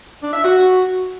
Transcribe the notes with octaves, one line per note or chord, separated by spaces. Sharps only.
D4
E5
F#4